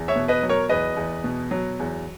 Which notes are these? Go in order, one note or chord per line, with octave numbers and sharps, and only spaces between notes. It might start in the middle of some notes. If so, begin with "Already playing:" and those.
Already playing: E2
C#5 E5
B2
B4 D#5
F#3
A#4 C#5
E2 B4 D#5
E2
B2
F#3
E2